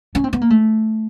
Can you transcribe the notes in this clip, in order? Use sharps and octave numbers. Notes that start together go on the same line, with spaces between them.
C#4
C4
B3
A#3
A3